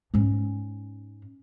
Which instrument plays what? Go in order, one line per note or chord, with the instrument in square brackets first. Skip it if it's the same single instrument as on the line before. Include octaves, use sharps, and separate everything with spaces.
[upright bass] G#2 C#4